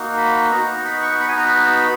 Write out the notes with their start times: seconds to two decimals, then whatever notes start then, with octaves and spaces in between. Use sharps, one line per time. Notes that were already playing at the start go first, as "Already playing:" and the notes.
Already playing: A#3 D#4 F#4
0.17 B5
0.51 B3 D#4 F#4 A#5
0.85 B5
1.02 C#6
1.20 B5
1.28 G#5
1.37 A#5
1.46 B5